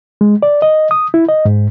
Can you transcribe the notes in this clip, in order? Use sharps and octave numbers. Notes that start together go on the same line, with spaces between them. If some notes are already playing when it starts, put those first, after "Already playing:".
G#3
D5
D#5
D#6
E4
D#5
G#2